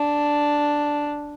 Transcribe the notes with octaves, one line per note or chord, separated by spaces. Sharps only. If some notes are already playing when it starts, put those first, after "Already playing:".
Already playing: D4